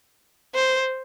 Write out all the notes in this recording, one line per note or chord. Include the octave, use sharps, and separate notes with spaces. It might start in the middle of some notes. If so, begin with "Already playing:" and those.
C5